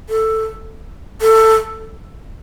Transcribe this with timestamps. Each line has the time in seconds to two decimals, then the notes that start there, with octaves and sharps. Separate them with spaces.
0.09 A4
1.22 A4